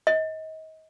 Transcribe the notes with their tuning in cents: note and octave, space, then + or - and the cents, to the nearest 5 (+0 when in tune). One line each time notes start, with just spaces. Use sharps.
D#5 +30